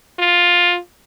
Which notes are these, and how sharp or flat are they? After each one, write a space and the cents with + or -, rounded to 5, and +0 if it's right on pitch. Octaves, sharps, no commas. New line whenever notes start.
F4 +10